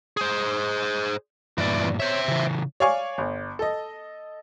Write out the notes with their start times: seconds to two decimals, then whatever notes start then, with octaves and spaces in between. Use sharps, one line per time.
0.17 G#4 C5
1.58 E2 G2 A#2 E3 D5
2.00 C5 C#5 E5
2.28 C#3 E3
2.80 C#5 D5 F5 G#5 C#6
3.18 G1
3.59 A4 D#5